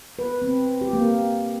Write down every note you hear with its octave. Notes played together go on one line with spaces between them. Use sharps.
B4
C4
G4
A#3